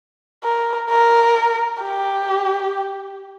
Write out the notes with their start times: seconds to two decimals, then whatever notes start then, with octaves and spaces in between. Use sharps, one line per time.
0.44 A#4
0.90 A#4
1.83 G4